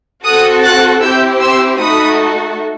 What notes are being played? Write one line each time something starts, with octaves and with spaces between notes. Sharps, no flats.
C4 F#4 A4 D#6 F#6
F#6 A6
C4 E4 G4 E6 G6
C6 E6
A3 D#4 F#4 A4 B5 D#6